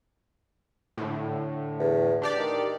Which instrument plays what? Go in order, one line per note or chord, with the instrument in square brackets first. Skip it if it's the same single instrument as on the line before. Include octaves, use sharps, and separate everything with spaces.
[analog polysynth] A2 D3
[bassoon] E2
[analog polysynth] D4 G4 D5
[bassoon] D#3